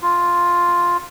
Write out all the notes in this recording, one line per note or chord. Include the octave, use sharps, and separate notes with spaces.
F4